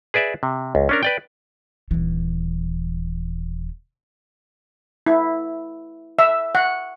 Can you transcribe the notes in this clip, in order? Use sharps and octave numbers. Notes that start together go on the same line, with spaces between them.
G#4 B4 D5 E5
C3
C#2
C#4 D4 A#4
B4 D5 G5
D#1 E3
E4
E5
F#5